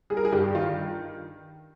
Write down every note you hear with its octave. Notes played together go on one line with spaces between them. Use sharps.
G3 G#4
A#4
G#4
G2 G4
D#3 F4